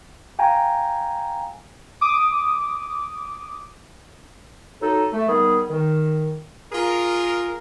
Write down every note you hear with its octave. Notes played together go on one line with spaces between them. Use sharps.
F5 G5 G#5 A#5
D6 D#6
F#3 D#4 A4
A3
D#3 G3 B3 G#4
D#3
F4 G#4 A#4